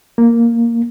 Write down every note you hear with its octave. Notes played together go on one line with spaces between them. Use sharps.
A#3